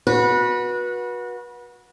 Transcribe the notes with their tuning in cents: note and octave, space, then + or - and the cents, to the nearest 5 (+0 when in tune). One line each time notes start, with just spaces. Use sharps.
F#4 -20 B4 -30